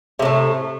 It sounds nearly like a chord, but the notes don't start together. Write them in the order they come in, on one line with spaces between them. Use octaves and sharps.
C3 A2 A3